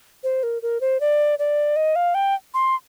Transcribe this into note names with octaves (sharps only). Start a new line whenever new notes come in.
C5
A#4
A#4
C5
D5
D5
D#5
F5
G5
C6